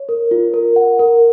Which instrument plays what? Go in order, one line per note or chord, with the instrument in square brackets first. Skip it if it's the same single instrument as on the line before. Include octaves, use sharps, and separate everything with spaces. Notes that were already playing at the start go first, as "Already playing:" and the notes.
Already playing: [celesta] C#5
A#4
F4
A#4
F#5
A#4